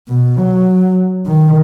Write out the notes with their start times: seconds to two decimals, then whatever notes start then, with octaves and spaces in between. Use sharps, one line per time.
0.08 B2
0.38 F#3
1.26 D#3